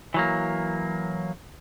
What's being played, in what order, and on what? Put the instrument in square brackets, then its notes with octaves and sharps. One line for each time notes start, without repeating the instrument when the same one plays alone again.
[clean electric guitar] E3 F#3 A#3